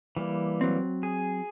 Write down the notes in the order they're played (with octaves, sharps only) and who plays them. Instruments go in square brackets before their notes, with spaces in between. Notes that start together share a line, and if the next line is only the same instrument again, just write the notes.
[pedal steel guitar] E3 G3 A#3
[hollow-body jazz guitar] F#3 C4
[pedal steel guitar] G#4